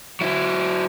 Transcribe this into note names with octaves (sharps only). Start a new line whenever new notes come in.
F#3 E4